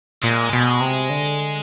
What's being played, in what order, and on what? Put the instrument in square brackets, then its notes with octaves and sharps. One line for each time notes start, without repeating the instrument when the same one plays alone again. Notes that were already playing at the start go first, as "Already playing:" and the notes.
[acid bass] A#2 [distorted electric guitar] G#3
[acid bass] B2
C3
D3